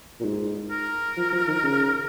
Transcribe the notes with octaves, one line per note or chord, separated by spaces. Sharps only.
A#2
G#2
A#4
F3
F3
D#3
C#3